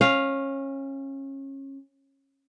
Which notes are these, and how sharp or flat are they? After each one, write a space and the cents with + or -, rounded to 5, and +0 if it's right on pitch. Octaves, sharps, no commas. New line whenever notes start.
C#4 -25 F5 +0